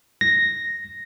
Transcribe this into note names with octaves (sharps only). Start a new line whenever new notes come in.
A#6